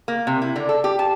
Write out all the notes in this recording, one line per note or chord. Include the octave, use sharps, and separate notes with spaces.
A#3
C3
E4
D3
A4
G4
A5